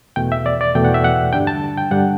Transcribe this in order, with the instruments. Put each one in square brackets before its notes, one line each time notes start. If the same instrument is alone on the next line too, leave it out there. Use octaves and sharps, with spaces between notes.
[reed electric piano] E2 B2 A3 G5
E5
D5
D5
E2 B2 A3 G5
F#5
E5
F#5
G2 D3 G3 D4 G5
A5
G5
G2 D3 G3 D4 F#5